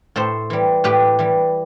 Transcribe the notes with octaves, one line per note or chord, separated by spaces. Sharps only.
A2 A4 C5
E3 G3
A2 G4 B4
E3 G3